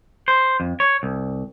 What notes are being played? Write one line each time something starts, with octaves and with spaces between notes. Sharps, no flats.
C5
F2
C#5
C2